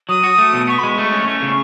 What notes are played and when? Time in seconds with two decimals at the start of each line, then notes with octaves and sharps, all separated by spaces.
0.09 F#3 D#6
0.24 F#4
0.38 A3
0.53 B2
0.67 B3 C#6
0.78 B5
0.83 G#3 C#6
0.98 A3
1.12 C#4
1.27 A3 C#6
1.42 C#3